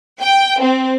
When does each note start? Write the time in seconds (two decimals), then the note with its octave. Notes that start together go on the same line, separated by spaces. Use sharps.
0.21 G5
0.61 C4